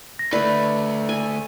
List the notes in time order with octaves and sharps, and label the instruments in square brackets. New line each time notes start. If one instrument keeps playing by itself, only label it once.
[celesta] A#6
[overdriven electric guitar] D3 A3 [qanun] B4 [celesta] D5
[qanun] G#5